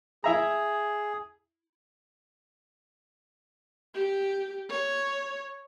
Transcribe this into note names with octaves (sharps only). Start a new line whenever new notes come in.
E4 G#4 E5 A#5
G4
C#5